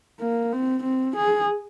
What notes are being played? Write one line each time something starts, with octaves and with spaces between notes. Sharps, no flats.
A#3
C4
C4
G#4